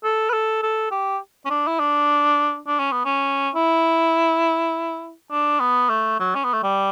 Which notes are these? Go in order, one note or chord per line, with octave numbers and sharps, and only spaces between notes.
A4
B4
A4
A4
G4
C#4
D4
E4
D4
D4
C#4
B3
C#4
E4
D4
B3
A3
F#3
C#4
B3
A3
G3